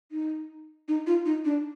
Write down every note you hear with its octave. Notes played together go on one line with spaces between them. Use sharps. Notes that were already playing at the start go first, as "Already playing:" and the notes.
D#4
D#4
F4
D#4
D4